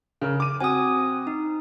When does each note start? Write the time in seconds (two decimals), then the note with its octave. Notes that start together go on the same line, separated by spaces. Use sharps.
0.21 C#3 A#4 F6
0.40 D6 D#7
0.60 C4 F#4 G#5 D#6
1.27 D#4